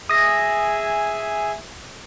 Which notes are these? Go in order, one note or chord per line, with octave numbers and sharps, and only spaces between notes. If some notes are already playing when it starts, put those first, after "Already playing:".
G#4 E5 G#5 D#6 A#6